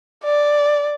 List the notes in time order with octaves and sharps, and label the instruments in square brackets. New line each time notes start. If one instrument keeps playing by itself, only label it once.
[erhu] D5